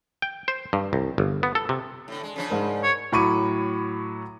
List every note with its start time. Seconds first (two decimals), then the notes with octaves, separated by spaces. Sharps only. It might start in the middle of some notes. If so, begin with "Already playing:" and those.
0.22 G5
0.48 C5
0.73 G2
0.93 C2
1.18 G1
1.43 B3
1.55 A4
1.69 C3
2.08 A2 D3
2.23 G#3
2.36 C#3 F3 D4
2.50 G#2 A#4
2.83 C#5
3.12 A2 F#3 B5 C#6 D6 D#7